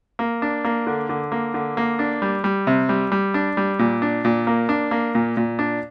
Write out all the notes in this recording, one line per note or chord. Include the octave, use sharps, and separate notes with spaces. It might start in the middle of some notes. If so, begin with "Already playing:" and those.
A#3
D4
A#3
D3
D3
A#3
D3
A#3
D4
G3
G3
C3
G3
G3
D4
G3
A#2
D4
A#2
A#3
D4
A#3
A#2
A#2
D4